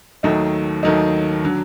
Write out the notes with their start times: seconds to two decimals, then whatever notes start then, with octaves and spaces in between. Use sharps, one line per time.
0.23 D#2 D#3 F#3 A3 D#4
0.83 D#2 D#3 F#3 A3 D#4
1.44 D3 F#3